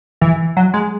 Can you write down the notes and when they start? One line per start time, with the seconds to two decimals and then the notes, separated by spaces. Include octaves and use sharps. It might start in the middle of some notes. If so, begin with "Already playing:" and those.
0.21 E3
0.57 F#3
0.74 G#3